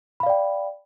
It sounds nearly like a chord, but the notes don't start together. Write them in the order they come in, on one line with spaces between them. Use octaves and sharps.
B5 F5 D5 G5